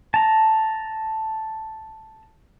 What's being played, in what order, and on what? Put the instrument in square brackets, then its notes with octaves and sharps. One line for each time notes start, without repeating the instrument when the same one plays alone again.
[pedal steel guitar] A5 A#5